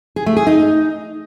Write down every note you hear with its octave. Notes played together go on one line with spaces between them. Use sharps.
G#4
A3
G#4
D#4